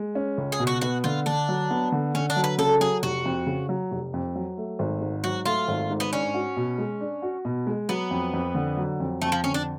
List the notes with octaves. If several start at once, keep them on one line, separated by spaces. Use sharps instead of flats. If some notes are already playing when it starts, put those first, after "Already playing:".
Already playing: G#3
C#4
C#2
G#4
B2
F#4
B3 F#4
D3 F4
D3 D4
F#3
B3
D3
D3 C#4
D4
F#3
B4
C#3 A4
F#3 G#4
F1 F#4
F2
C#3
F#3
F1
F2
F#3
A3
G#1
G#2
F#3 F#4
A3 F4
G#1
G#2
B3
C#4 D4
F#4
B2
G#3
D4
F#4
B2
G#3
F#3 B3
F2
F2
D3
F#3
F2
F2 A3
F3
D3 C#4
D4